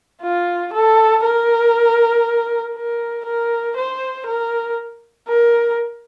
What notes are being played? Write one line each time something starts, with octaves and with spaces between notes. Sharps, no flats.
F4
A4
A#4
A#4
A#4
C5
A#4
A#4